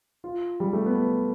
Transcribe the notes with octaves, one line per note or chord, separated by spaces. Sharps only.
F4
G3
A3
B3